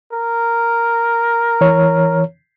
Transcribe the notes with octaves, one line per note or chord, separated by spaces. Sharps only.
A#4
E3 C#5